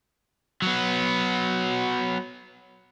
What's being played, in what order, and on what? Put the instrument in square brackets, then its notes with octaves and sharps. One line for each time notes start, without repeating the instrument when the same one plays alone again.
[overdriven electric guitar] F#3 B3